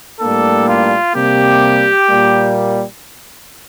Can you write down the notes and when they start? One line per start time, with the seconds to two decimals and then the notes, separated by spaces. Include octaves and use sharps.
0.20 A2 G3 A#3 D4 A4
0.66 F4
1.14 C3 G3 A#3 G4
2.07 A#2 G3 A#3